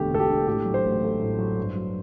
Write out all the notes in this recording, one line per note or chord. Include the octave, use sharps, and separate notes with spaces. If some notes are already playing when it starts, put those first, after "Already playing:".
Already playing: E1 D2 D3 A3 G4 A4
D2 A4
G4
D3
A2 G4
F#3
C5
A1
A3
A2
F#3
G2
F#3